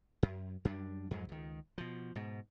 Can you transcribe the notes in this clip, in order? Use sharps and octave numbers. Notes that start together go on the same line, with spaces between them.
F#2
F#2 G3 D4
F2 G#2 F#3 G#3
C#2 D#3
B2 F3
G#2 B2